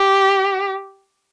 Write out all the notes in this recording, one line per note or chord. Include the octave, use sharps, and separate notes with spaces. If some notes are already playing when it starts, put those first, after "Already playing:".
Already playing: G4